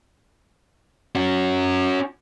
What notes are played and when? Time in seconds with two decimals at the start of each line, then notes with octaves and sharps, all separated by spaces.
1.15 C#4 F#4